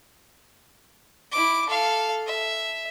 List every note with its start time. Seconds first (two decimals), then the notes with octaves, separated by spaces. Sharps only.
1.31 E4 D6
1.68 A4 F5
2.26 E5